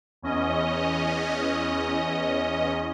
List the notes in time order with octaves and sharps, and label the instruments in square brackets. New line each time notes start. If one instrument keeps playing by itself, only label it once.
[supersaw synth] E2 C#4 D#5